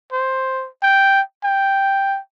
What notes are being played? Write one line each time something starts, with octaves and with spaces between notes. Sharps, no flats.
C5
G5
G5